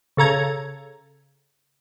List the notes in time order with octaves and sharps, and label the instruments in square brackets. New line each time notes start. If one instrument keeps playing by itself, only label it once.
[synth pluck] C#3 A4 A#5 G#6